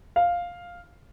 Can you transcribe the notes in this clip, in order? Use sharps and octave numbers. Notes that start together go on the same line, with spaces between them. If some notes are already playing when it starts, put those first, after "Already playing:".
F5